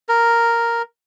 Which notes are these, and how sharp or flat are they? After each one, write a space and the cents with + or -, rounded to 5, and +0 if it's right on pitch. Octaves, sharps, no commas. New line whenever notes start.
A#4 +0